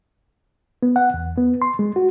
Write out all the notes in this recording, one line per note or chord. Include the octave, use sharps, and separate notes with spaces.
B3
F#5
E2
B3
C6
G#3
F#4